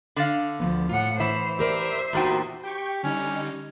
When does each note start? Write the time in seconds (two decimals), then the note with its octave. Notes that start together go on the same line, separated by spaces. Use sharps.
0.16 D3 D5 F5
0.60 D2 F3 B3
0.89 A2 F4 F#5
1.20 E3 C5 E5
1.59 G4 A#4 C5 D5 E5
2.13 E2 A#2 D#4 F#4 G4 G5
2.63 G4 G5 C#6
3.03 D3 G3 C#4 D#4